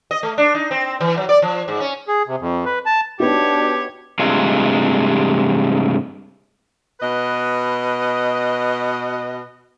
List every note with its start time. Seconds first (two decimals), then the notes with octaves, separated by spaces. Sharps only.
0.11 D#5
0.23 A3
0.38 D4
0.55 D#4
0.71 C4
1.01 E3
1.17 F#3
1.29 D5
1.42 F3
1.68 G#2
1.80 C#4
2.08 G#4
2.27 C3
2.40 F2
2.66 B4
2.86 A5
3.20 B3 D4 D#4 F#4 G4 C#5
4.19 G2 C3 G#3 A3 F4
7.00 B2 B4 D#5